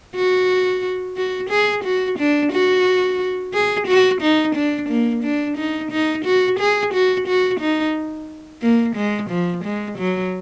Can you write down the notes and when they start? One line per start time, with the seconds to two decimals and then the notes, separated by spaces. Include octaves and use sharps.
0.15 F#4
1.17 F#4
1.50 G#4
1.84 F#4
2.19 D4
2.52 F#4
3.54 G#4
3.87 F#4
4.21 D#4
4.55 D4
4.89 A#3
5.23 D4
5.57 D#4
5.91 D#4
6.25 F#4
6.59 G#4
6.94 F#4
7.27 F#4
7.60 D#4
8.62 A#3
8.96 G#3
9.30 F3
9.64 G#3
9.98 F#3